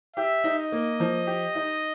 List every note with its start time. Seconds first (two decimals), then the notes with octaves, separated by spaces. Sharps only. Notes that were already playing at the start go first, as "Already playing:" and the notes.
0.16 G4 E5
0.44 D#4
0.58 D#5
0.72 A#3
1.00 F3
1.27 G4
1.55 D#4